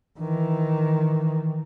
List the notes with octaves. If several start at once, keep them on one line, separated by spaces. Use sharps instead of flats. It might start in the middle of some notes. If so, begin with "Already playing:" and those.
D#3 E3